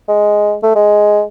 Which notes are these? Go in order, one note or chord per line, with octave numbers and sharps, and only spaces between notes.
G#3
A3
G#3